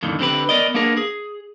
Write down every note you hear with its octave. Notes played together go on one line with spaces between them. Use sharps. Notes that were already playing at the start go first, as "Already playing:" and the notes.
F2 A2 D3 D#3
D3 C4 G4 B4
B3 A#4 D5 D#5
A#3 B3 D4 G#4 A#4
G#4